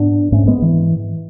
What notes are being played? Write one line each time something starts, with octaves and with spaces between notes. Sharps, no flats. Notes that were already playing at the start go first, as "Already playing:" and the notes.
Already playing: G#2 B3 D4
G#2 A3 C#4
G#3 B3
E3